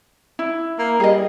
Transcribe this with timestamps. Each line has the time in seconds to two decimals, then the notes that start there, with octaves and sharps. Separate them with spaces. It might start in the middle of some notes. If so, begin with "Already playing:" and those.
0.39 E4
0.79 A#3
1.00 G3 G#4 D#5